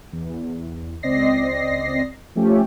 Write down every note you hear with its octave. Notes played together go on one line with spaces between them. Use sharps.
E2
C#2 C4 D5 D#5 A#6 C7
F3 A3 C#4 G4